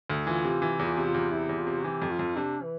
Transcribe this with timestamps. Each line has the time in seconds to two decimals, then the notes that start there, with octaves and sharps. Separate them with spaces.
0.10 D2
0.27 E3 F4
0.44 C3
0.62 E3
0.79 E2 F4
0.97 C3
1.05 F4
1.14 E2
1.32 C3 E4
1.49 E2
1.59 F4
1.67 C3
1.84 E3 G4
2.02 F2
2.11 F4
2.19 F2
2.37 C3 D4
2.63 E3